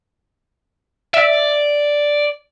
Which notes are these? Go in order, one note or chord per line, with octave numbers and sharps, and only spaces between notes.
D5 E5